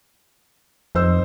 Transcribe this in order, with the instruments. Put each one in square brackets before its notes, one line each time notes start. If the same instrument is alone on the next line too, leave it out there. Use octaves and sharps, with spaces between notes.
[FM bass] F2 [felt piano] D#4 C5 E6